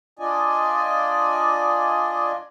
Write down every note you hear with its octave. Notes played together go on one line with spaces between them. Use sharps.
D4 F4 D5 D#5 G#5